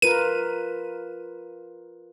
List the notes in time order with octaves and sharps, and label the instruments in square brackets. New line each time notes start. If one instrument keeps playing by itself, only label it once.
[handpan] F4 A#4 B4 [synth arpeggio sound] D#7